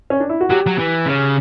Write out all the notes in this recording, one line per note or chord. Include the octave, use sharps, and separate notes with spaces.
C#4
D4
E4
F#4
F#3 G4
F#3
E3
C#3